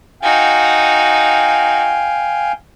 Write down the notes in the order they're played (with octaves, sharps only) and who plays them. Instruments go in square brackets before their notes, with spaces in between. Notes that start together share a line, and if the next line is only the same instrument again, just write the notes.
[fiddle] D#4 F#4 [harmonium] F5 G5 G#5